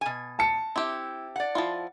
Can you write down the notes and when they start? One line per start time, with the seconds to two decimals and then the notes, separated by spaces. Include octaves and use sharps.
0.01 B2 G#5
0.39 A5 C#7
0.76 C4 E4 G4
1.36 D5 F#5
1.55 F3 E4 F4